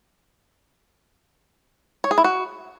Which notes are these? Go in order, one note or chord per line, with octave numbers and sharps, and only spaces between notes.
C#5
G#4
E4
F#4